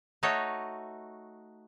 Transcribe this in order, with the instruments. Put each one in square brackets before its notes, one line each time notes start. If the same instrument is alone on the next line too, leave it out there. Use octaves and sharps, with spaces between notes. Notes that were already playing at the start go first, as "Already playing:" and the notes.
[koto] A3 D#4 F#4 C#5 D#5